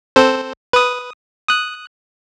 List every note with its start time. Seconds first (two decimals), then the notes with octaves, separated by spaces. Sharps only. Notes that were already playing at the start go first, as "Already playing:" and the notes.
0.16 C4 A4 C5
0.73 B4 D#6
1.48 D#6 F#6